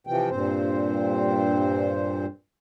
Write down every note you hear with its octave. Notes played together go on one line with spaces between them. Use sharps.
C3 E3 F3 G5
G2 A#2 C4 C5